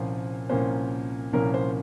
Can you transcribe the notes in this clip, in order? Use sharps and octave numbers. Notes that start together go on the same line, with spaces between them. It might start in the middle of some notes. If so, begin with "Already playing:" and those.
Already playing: C2 A#2 F3 A#3 C#4 C5
C2 A#2 F3 A#3 C#4 C5
C2 A#2 F3 A#3 C#4 A#4
C5